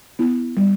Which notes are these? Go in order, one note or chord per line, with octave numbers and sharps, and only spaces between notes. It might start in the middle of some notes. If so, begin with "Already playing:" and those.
B3 E4
G3